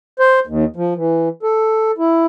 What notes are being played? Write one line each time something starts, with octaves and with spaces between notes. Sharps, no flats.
C5
D#2
F3
E3
A4
E4